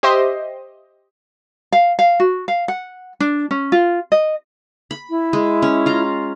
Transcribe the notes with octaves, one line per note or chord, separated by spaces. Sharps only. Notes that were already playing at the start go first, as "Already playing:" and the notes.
G4 C5 D#5 E5 C6
F5
F5
F#4
F5
F#5
D4
C#4
F4
D#5
B5
E4
G#3
C#4
F4 A#5